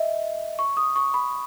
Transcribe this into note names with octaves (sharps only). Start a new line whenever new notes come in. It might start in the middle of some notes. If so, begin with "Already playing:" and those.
Already playing: D#5 E5
C#6
D#6
C#6
B5